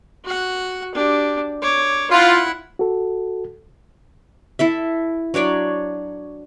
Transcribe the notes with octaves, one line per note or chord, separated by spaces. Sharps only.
F#4 F#5
D4 G4
C#5 D6
E4 F4 F#5
F#4 A4
E4 A4 E5
F#3 D4 C#5 D5